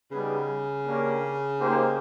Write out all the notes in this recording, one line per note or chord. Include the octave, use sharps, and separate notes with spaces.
C#3 G3 B3 D#4 G#4 B4
A#3 D4 G4 A#4 C#5
A#3 D#4 G4 C5